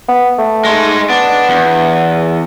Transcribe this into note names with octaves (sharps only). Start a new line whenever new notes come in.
B3
A3
G#3 D#4
B3 D4
E2